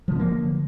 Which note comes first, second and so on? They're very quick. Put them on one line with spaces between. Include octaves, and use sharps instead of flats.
F3 D3 C4 A#3